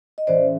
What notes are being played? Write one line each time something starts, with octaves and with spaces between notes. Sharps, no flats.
D#5
A2 E3 G#3 C#4 C5 D5